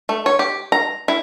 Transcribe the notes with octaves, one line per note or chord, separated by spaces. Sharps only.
A3
C#5
G4
A#5
E4